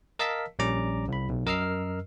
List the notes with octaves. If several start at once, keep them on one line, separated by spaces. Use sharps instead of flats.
A#4 D#5 F5 A5 E6 B6
A#1 G3 C#4 D5 A#5 D6
C2 B5
B1
F#2 A#4 D#5 E6 F6 C7